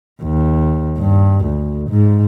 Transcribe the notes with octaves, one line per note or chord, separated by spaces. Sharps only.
D#2
G2
D2
G#2